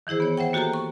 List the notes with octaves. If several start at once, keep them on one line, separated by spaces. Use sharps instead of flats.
D#3 E3 E4 G#4 C5
B3 C#5
C5 E5 F#5 G5
A#3 F#4 G4 A4 G5 A#5
C#6